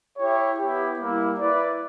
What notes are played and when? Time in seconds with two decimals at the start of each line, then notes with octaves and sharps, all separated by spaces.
0.19 E4 G4 C#5
0.59 B3 E4 G4
1.00 G3 A#3 E4
1.40 E4 B4 D5